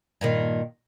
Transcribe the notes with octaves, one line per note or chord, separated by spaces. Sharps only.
G2 A#2 D#3